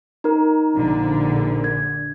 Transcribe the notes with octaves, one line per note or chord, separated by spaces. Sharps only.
D#4 A#4
A#1 D3
G#6